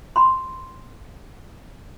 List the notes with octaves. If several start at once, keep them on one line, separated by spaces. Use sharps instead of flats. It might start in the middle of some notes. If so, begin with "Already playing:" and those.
B5 C6